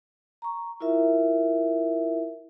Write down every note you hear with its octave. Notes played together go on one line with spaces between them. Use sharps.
A#5 C#6
E4 F4 A#4 E5